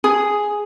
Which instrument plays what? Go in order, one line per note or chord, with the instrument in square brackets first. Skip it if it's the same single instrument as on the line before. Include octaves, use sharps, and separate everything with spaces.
[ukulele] G#4